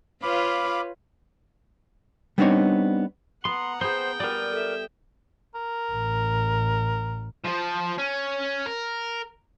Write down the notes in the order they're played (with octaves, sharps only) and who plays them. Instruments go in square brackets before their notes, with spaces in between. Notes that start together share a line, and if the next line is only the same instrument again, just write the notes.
[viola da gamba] F4 B4 C#5 [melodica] F5 B5 D6
[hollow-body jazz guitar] G3 B3 C4 D4 D#4 C#5
[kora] B3 [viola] F#5 A#5 [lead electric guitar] C6
[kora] B3 G#4 [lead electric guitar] C5 [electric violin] G5
[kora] G3 B3 [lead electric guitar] A#4 D5
[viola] A4 E5
[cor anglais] A#4
[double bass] A1
[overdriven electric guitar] F3 C5
C#4
A#4